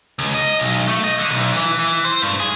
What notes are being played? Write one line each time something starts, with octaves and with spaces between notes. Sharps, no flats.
C#2
D#5
B1
A3
D#5
D3
B1
E3
E3
C5
G2
G#4